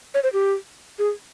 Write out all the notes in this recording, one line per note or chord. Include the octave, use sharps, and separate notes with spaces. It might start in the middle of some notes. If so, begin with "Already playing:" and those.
C#5
C5
G4
G#4